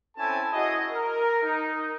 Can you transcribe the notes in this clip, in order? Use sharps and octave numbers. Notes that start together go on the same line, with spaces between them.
C4 C#4 E4 A4 G#5 A5
E4 F#4 G#4 D#5
A#4
D#4